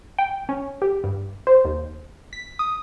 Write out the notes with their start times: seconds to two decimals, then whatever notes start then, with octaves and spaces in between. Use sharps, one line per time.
0.19 G5
0.49 C#4
0.82 G4
1.04 G2
1.47 C5
1.65 D#2
2.33 B6
2.59 D#6